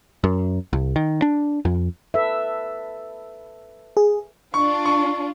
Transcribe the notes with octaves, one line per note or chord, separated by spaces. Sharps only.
F#2
C2
D#3
D4
F2
A4 B4 E5
G#4
D4 F4 C#6
C#6